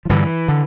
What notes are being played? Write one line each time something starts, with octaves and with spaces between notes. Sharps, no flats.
F3
G2 D3 E3
D3